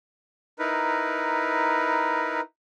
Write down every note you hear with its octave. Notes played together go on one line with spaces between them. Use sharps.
D#4 E4 A#4 B4